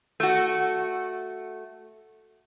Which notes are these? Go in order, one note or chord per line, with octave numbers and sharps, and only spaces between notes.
A3 F#4